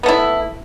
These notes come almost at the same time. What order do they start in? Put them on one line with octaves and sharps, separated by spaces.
B3 A3 E4